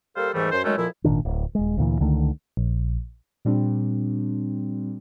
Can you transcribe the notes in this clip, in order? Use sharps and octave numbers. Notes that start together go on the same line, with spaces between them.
G3 A#3 A4 C5 F5
D#2 G#2 E3 G3 A3
F#2 C5
D#3 F#3 G#3 A3 C#4
F2 A#2 F3 E4
G#1 A#2 D#3 D4
D1
D#1 G#3
D2 A#2 E3
C#2 D3 D#3 A3
A#1
A#2 G3 C4 D4